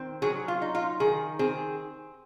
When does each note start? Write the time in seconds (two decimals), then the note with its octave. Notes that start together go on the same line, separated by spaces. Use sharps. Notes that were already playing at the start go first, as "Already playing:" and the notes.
Already playing: D#3 C4
0.22 F#3 G#4
0.48 F4
0.62 D#4
0.75 F4
1.00 D#3 G#4
1.39 C4 G#4